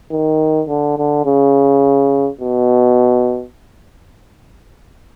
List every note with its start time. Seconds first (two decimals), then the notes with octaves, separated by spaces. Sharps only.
0.11 D#3
0.68 D3
0.98 D3
1.26 C#3
2.41 B2